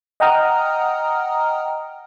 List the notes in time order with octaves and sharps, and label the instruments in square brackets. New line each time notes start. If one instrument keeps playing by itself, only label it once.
[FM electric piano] D#5 F#5 G5 A#5 D#6 F6